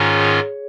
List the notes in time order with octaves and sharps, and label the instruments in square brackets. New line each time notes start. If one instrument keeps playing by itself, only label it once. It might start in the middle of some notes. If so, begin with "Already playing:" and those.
Already playing: [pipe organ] G#2 D#3 C#4 F4 [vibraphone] G#4 C#5